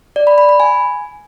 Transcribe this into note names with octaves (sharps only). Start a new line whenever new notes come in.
D5
B5
B5
B5
G#5